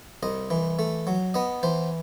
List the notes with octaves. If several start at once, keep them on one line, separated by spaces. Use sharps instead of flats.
C2 D#5
E3
A3
F#3
B3 D#5
E3 C5